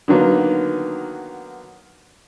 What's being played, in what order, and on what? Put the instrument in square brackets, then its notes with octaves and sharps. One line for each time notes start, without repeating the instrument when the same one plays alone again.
[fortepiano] D3 D#3 F#3 A#3 B3